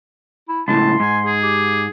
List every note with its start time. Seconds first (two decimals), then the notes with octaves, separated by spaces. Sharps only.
0.49 E4
0.68 C#2 A2 A5 C6
1.00 G#2 G#5
1.26 G#4
1.43 G4